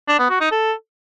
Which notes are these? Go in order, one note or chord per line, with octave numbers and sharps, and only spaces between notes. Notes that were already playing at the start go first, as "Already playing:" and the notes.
D4
B3
F#4
D#4
A4